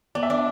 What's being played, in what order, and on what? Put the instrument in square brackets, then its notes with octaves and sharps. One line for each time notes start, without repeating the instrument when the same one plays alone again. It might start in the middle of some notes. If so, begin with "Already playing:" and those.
[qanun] B3 [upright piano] D5
[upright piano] E5
[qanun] D4 [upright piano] D5